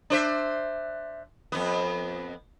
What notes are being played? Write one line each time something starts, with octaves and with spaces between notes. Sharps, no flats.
D4 C5 E5
F2 B3